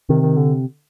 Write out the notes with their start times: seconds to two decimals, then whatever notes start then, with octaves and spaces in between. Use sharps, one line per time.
0.09 C3 D#3
0.22 D#3
0.37 D3